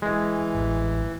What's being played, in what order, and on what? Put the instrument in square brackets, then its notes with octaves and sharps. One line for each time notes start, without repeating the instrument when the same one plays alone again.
[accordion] E3 [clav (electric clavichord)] G#3
[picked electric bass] A1